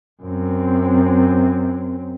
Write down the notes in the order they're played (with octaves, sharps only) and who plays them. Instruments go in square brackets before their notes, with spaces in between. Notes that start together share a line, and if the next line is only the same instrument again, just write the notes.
[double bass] F#2 C4